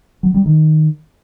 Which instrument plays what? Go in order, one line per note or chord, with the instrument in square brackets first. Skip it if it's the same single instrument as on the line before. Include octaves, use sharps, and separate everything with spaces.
[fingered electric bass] F#3
G3
D#3